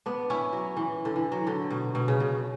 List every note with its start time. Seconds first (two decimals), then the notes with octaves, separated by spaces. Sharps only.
0.06 B3 D4
0.30 C#4 E4
0.53 F#3
0.77 E3
1.05 D3
1.16 E3
1.32 F#3
1.47 D3
1.71 B2
1.95 B2
2.08 C#3
2.20 B2